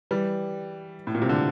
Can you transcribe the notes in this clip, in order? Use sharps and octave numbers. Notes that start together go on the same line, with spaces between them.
E3 G3
A2
A#2
C3
D3